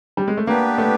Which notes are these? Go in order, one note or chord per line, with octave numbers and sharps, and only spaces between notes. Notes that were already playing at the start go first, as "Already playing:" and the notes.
G3
G#3
A3
A#3 B3 D4 G4 B4
A3